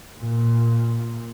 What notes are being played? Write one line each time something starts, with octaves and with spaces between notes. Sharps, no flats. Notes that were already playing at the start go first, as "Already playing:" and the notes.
A#2